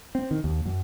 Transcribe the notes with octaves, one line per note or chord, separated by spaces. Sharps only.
C4
D#3
D#2
F#2